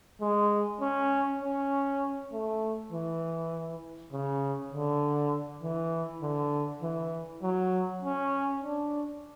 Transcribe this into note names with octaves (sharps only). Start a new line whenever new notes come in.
G#3
C#4
C#4
A3
E3
C#3
D3
E3
D3
E3
F#3
C#4
D4